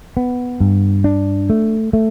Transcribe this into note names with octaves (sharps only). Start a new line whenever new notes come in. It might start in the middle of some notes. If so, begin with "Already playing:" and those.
B3
G2
D4
A3
A3